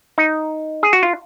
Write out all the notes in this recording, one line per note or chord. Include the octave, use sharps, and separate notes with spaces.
D#4
G#4
F#4
F4